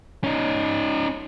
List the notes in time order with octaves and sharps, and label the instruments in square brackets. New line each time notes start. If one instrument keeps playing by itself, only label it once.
[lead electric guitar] C#4 D#4